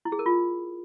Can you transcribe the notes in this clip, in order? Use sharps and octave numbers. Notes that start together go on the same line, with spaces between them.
E4
G#4
A#4
F4